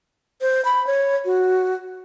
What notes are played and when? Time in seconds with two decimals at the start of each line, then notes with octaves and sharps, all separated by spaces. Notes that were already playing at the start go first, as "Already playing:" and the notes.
0.41 C5
0.65 B5
0.87 C#5
1.25 F#4